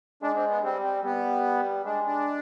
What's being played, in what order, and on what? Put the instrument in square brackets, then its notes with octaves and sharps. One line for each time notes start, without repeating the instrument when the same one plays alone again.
[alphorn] G#3 [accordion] D4
[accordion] C4
B3
[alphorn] G3 [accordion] C4
[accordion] C4
[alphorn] G3 [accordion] B3
[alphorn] G#3 [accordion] D4
[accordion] D4